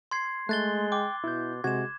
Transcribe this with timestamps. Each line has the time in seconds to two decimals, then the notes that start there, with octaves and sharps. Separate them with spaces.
0.11 C6 G#6 C7
0.49 G#3 A3 F#6 A6 G7
0.92 G5 D6
1.24 B2 E4 G6
1.64 C3 G#3 F#4 G#6 E7